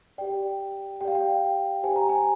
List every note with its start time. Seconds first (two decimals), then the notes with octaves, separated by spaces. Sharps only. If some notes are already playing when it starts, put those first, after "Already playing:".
0.18 G4 D5 G5
1.01 G4 G5
1.05 D5 F5
1.15 G5
1.83 G4 C5 G#5
1.96 A#5
2.09 G#5